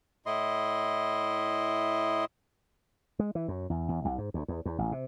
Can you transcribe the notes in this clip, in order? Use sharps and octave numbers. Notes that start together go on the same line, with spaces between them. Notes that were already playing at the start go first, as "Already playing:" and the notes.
A2 E4 D#5 C6
G#3
E3
F#2
E2
E2
C2
G#2
D2
E2
E2
A1
C3